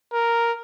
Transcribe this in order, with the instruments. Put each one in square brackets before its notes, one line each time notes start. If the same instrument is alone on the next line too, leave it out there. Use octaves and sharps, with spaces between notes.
[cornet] A#4